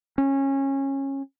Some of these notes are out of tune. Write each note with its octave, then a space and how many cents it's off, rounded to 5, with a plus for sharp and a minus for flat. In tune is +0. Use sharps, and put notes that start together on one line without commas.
C#4 -20